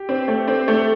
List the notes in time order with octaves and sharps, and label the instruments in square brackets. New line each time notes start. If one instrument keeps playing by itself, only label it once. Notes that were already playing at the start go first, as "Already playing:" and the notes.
Already playing: [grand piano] G4
[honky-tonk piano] C4
A3
C4
A3